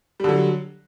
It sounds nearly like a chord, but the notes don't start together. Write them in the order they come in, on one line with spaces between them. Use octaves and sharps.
G3 D3 F#3